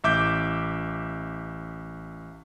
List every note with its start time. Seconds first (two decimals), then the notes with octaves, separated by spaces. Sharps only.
0.04 A1 E5 D6 G6